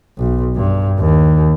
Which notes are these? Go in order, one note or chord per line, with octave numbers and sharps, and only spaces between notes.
B1
G2
D#2